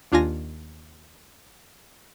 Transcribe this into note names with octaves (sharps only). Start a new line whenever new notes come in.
D#2 D4 F4 G#5 A#6